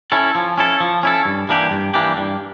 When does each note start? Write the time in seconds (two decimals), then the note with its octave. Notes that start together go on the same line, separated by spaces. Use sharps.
0.12 C#4 E4 A4
0.35 F3
0.58 C#4 E4 A4
0.80 F3
1.03 C#4 E4 A4
1.25 G2
1.49 E3 A#3 D4 G4
1.71 G2
1.94 E3 A#3 D4 G4
2.17 G2